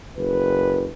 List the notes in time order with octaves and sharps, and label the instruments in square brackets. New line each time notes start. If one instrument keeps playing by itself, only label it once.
[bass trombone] F#1 [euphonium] B4